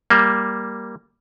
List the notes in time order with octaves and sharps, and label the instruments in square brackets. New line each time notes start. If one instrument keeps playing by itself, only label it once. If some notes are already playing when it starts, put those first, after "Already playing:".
[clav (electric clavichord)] G3 A#3